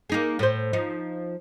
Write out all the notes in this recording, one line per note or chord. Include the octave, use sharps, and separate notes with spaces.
A#3 D#4 G#4
A2 C5
F3 D#4